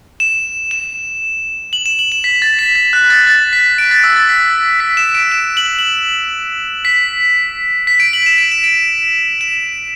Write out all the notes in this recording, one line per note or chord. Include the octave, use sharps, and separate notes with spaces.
E7
E7
F#7
E7
F#7
E7
B6
A6
B6
B6
F#6
A6
A6
B6
D7
A6
E6
A6
B6
B6
E7
D7
E7
F#7
F#7
B6
B6
D7
F#7
E7
D7
E7
D7
E7